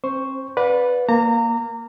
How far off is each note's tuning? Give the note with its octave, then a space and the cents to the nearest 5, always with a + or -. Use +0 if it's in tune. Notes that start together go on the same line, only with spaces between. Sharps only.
C4 +40 C5 +0 C#6 +0
B4 +0 D5 -10 F#5 -45
A#3 +0 A#5 -30